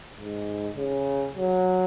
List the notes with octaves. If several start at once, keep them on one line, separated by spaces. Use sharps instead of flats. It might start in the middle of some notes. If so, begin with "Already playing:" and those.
G#2
C#3
F#3